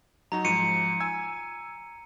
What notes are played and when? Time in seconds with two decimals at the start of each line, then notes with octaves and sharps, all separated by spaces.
0.32 F#3 D#4 F#4 A#5
0.45 G#2 F3 C#7 D#7
1.00 G#5 E6 G#6